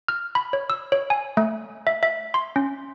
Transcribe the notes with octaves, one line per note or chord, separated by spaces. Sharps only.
F6
B5
C#5
E6
C#5
G#5
A3
E5
E5
C6
C#4